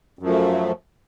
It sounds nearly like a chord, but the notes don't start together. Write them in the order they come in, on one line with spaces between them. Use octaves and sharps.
F#2 F3 A3